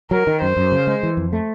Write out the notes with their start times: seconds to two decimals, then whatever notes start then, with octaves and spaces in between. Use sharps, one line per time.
0.11 F#3 A#4
0.27 D#3
0.42 F#2 C5
0.57 F#2
0.72 C#3
0.87 G#3
1.03 E3
1.17 F2
1.33 A3